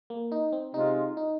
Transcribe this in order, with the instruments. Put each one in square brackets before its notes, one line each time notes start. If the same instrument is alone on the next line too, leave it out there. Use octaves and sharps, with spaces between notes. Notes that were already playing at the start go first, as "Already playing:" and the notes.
[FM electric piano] A#3
D#4
C4
[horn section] C3 G#3 F4 [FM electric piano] D#4
[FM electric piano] D#4